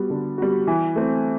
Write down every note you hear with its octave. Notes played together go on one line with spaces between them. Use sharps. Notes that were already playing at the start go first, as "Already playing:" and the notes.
Already playing: G3 B3 F#4
D3
G3 B3 F#4
E3
A3 C4